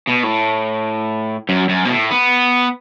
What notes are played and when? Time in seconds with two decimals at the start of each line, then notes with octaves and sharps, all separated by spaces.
0.08 B2
0.24 A2
1.49 F#2
1.69 F#2
1.85 B2
1.90 A2
2.11 B3